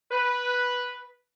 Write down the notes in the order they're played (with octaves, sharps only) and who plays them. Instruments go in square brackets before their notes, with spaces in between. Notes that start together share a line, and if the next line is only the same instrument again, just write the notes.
[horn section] B4